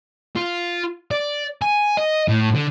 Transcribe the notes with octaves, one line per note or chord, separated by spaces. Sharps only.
F4
D5
G#5
D#5
A2
D3